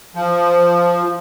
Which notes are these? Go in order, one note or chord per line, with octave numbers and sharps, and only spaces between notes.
F3